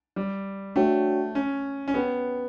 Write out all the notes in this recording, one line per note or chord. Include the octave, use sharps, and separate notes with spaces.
G3
A3 D4 F#4 C#5 G5
C#4
C#4
B3 G4 C#5 G5